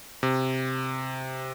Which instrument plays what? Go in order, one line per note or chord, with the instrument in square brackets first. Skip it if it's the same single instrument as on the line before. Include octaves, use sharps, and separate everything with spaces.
[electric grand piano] C3